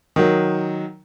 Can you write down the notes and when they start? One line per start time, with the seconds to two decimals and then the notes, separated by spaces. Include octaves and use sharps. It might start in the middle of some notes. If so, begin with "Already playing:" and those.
0.16 D#3 F#3